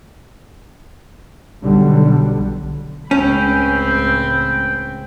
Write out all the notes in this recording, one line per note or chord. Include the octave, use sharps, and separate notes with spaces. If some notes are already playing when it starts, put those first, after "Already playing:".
B1 D3 G3
C#2 A2 C4 C#4 G5 B5